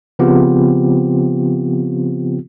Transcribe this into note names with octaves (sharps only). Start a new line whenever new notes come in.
C#3 F3 B3 C4 F4 G4